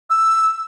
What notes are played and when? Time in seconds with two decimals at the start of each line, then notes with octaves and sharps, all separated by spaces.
0.10 E6